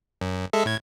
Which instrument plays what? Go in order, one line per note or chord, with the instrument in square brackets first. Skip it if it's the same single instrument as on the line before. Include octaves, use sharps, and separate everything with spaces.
[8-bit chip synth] F#2
G#3 A4 E5
A2 G#6